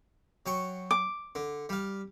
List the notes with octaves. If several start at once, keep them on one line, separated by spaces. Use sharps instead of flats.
F#3 G5 C#6
D6
D3
G3 F5